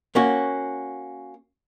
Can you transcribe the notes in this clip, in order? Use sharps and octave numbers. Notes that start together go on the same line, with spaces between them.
A#3 C#4 F#4